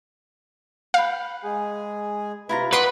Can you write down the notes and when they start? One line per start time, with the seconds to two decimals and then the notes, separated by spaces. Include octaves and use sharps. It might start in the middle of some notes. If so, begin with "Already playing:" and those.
0.94 B4 F5 G5
1.44 G#3 G#4 G#5
2.49 C3 E4 F4 B4 A#5
2.73 B4 D5 F#5 C6 D6 D#6 D7